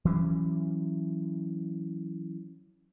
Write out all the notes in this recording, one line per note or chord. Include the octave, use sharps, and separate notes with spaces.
E3 F#3 C#4